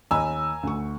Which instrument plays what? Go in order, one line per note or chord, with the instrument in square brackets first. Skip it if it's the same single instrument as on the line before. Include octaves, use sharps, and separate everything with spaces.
[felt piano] D#2 D#5 B5 [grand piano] G#5 A#5 E6
[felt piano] D2 C#6